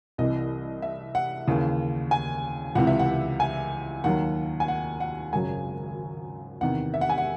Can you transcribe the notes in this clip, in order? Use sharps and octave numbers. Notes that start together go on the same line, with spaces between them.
C2 C3 E3 D#5
E5
F#5
D#2 C#3 E3
G#5
C#2 C3 E3 F#5
E5
F#5
G#5
D#2 D#3 F#3 F#5
G#5
F#5
F#5
G#1 F#2 C#3 F#3 G#5
E2 C3 D#3 F#5
E5
F#5
G#5
F#5